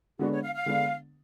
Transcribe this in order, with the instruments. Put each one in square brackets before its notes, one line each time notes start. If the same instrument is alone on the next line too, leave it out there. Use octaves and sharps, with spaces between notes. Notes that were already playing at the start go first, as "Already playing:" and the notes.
[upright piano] D3 G#3 B3 D4 [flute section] F#4
[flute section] C#5
F5
F5
[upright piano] D3 G#3 B3 D4